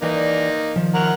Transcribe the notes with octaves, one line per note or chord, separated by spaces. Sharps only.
E3 A#3 D#4 B4 D5
D#3 F3
A#4 F#5 A#5